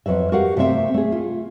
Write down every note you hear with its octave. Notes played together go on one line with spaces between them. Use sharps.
F2 F#3 B4 E5
F#4 G4 A#4 F5 F#5
C3 A3 C4 E5
A3 G#4
F4